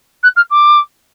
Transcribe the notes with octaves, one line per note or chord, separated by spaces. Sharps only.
F#6
F6
D6